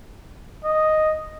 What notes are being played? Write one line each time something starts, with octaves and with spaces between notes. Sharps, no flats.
D#5